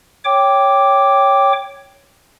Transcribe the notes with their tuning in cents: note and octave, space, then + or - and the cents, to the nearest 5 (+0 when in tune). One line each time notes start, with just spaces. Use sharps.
C#5 +0 G5 +0 D6 -5